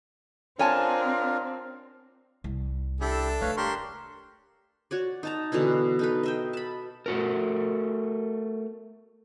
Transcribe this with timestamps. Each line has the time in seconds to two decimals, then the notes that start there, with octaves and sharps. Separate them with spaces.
0.59 C4 D4 F4 A#4 C#5 G#5 A5
2.44 C2
3.01 D4 E4 G4 A4
3.41 A3 B4 C#5 F5
3.57 D4 G4 A#4 C6 C#6
4.91 F#4 C#5 D5
5.23 D#4 A5 A#5
5.52 B2 D3 E3 E4
5.99 D#4 A4 B4
6.23 D#5 E5 G5
6.53 A5 B5
7.06 A3 F#4 A#4